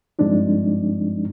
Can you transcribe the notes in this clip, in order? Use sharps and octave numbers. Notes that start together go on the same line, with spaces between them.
G2 F3 G#3 C4 D4 D#4